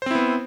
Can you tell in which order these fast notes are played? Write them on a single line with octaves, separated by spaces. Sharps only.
C5 C4 E4 B3